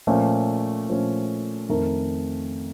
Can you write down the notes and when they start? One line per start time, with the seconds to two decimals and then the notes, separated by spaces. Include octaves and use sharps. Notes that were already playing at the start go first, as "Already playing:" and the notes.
0.07 A#2 F3 A3 C#4
0.88 A#2 F3 A3 C#4
1.69 F2 D#3 A3 D#4 A#4